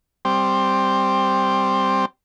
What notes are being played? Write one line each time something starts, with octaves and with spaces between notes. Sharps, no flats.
G3 C4